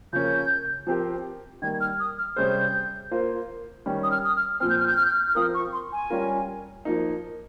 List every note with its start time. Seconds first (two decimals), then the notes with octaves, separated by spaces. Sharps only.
0.13 C#3 F3 A#3 C#4 G6
0.87 F3 C4 G4 A#4
1.62 D#3 G3 A#3 G#6
1.81 F6
2.00 D#6
2.18 F6
2.36 C3 G3 C#4 G#4 C5 G6
3.11 A#3 F4 C5
3.86 D#3 G3 C#4
4.03 D#6
4.11 F6
4.25 D#6
4.36 F6
4.60 A#2 F3 C4 F6
4.70 G6
4.79 F6
4.88 G6
4.97 F6
5.06 G6
5.14 F6
5.28 F6
5.35 F3 C4 F4 A#4 D#6
5.54 C#6
5.73 C6
5.92 G#5
6.10 G3 C#4 F4 A#4
6.85 F3 A#3 D#4